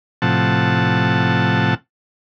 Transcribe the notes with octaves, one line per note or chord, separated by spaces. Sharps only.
A2 C3 F3 F#5 A5